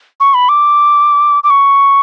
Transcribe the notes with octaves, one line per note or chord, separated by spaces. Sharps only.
C#6
B5
D6
D6
C#6